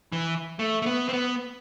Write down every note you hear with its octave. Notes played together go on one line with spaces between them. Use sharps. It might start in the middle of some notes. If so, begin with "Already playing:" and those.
E3
A3
A3
B3
C4
B3